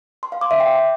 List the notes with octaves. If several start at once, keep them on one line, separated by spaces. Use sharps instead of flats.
C6
F5
D6
E5
G5